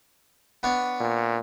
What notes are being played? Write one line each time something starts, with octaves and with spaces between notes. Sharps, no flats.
B3 D4 C#5
A#2